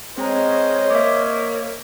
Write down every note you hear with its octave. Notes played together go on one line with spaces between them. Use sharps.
G#3 C4 C5 C#5 D#5 A#5
A#3 E5 D6